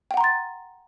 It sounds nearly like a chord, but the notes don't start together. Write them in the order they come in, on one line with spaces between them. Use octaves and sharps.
G5 F#5 A#5 C6 A6